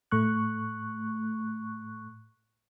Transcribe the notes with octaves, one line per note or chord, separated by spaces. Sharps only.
A2 A3 C#6 F#6